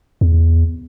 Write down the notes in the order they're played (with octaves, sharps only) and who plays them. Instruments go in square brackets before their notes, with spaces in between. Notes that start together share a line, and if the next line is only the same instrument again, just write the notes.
[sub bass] E2